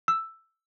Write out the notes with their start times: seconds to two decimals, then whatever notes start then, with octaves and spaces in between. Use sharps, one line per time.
0.08 E6